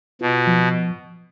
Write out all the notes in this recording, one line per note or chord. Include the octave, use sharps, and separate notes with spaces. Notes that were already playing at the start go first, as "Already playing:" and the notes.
B2 F4
F3